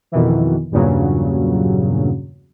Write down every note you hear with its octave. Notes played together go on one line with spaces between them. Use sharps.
F2 B2 D#3 E3
E2 G2 A#2 C#3 F#3